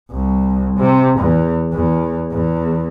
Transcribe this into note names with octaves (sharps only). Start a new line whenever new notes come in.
C2
C3
E2
E2
E2